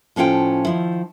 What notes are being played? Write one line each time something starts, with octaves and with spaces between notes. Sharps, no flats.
A2 F3 C#4 F4 G5
D#3 F3 E4